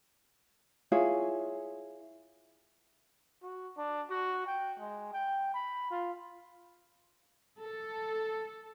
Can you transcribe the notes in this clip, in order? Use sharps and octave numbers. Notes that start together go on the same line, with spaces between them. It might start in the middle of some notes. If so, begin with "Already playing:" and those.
E4 F4 G#4 C#5
F#4
D4
F#4
G5
G#3
G5
B5
F4
A4